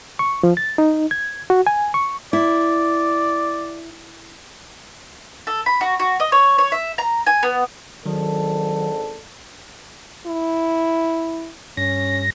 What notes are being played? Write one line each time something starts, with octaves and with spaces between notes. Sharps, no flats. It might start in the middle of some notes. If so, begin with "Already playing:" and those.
C#6
F3
A6
D#4
G#6
F#4
G#5
C#6
E4 D5
A4
B5
F#4
F#4
D#5
C#5
C#5
E5
A#5
G#5
B3
G#1 D#3 F#3 D4 A4
E4
G2 C#4 A#6